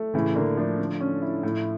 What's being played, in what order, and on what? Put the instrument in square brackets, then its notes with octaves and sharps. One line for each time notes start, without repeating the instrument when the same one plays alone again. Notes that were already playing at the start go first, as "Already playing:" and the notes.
Already playing: [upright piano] A3
[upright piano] A2 [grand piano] C#3 E3
[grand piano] D3 [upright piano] A#3
[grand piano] F3 A3 [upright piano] D4
[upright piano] D3
C#4
E4
A2